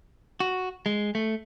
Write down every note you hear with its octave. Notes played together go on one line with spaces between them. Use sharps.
F#4
G#3
A3